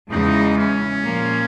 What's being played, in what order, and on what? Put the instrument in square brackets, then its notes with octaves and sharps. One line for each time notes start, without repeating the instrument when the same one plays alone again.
[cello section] E2 C#3 E3 G#3 B3 [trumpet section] D#4
[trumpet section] C#4
[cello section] A#2 F3 A#3